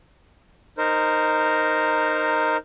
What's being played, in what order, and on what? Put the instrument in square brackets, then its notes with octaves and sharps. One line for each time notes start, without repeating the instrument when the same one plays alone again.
[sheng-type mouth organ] D#4 A#4 C5